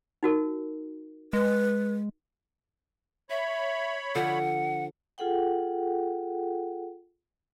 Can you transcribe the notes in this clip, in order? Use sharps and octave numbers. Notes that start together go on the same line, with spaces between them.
D#4 F#4 A#4
G#3 B4
C#5 E5 B5
D3 F3 F#5
F4 G#4 A4 F#5 G5